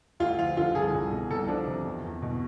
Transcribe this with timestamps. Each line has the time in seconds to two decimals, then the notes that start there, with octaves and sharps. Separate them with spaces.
0.20 D2 F4
0.39 F3 F4
0.57 D3 F4
0.75 C2 G#4
0.94 C2
1.12 B2
1.30 C2 A4
1.48 F3 D4
1.67 C3
1.86 E2
2.04 E2
2.22 B2